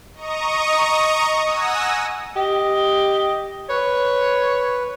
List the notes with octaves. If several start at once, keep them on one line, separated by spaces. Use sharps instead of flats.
D#5 A#5 C#6 D#6
F#5 G#5 D#6 E6 A#6
G4 D#5
B4 C#5